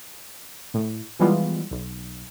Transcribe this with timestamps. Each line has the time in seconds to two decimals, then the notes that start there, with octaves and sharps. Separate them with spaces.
0.74 A2
1.19 E3 F3 G3 G#3 B3 F4
1.71 B1